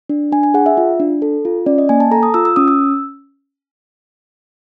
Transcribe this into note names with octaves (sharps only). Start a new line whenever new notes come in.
D4
D4 G#5
G#5
G#4 F#5
E5
F4
D4
A4
F4
C#4 D5
D#5
A#3 G#5
A5
A4 A#5
D#6
F4 E6
E6
C#4 D#6
E6